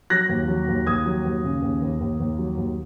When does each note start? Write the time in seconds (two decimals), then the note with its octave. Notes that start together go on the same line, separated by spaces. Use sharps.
0.10 F#3 F#6 A#6
0.29 D#2
0.48 F#3
0.68 D#2
0.86 D#2 D#6 G#6
1.06 F#3
1.25 D#2
1.44 C#3
1.62 D#2
1.82 D#2
2.00 D#2
2.20 D#2
2.38 F#3
2.57 D#2